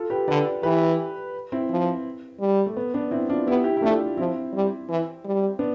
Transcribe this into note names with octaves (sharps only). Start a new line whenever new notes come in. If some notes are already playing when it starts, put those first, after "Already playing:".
Already playing: F4 A4
G4 B4
D3 B4 D5
E3 G4 B4
C4 E4
F3
G3
A3
B3
B3 D4
C4 E4
D4 F4
B3 E4 G4
E4 G4
E4
A3 D4 F4
F3 C4 E4
G3
E3
G3
B3 D4